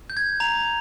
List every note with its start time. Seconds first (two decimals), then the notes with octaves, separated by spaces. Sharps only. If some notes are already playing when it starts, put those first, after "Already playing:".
0.10 G6
0.17 G#6
0.40 A#5 F7